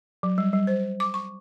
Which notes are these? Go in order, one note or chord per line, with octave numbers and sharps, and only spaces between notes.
F#3
G3
G3
C5
D6
C#6